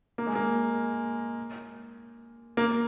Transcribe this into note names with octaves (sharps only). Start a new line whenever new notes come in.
A#3
G#3
A#3
A#3